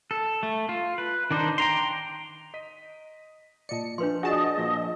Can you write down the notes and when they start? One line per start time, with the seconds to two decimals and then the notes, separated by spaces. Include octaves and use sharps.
0.11 A4
0.43 A3
0.69 F4
0.98 B4
1.31 D#3 D4 D#4 C5
1.58 G5 A#5 C6
2.54 D#5 B6 D#7
3.69 A#2 D5 D#5 A5 C#7
3.98 F3 D4 B4 C6
4.23 F4 F#4 G#4 D5 D#5 A5
4.57 A#2 F3 D#6